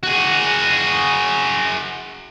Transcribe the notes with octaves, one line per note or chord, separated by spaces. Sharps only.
F#4 G#4